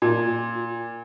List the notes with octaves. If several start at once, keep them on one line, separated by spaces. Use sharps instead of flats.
A#2